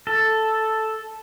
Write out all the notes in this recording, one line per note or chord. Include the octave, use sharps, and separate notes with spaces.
A4